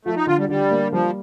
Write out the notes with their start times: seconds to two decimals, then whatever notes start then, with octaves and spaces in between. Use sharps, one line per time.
0.05 F3 A3
0.16 D#4
0.27 D3 F4
0.38 G3
0.49 D3 G3
0.71 A#3
0.92 F3 G3